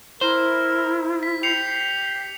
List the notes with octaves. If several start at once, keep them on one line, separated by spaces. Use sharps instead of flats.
E4 A#4 C5
B6
G4 C7 C#7 F7